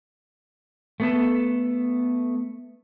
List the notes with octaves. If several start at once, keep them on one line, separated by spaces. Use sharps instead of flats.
A3 B3 A4